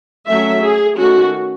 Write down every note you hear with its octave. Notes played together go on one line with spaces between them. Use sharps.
F#3 A3 C#4 E5
G#4
D#3 A3 C#4 F#4